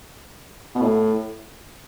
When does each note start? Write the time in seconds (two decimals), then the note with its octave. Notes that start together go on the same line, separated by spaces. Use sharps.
0.75 B2
0.82 A2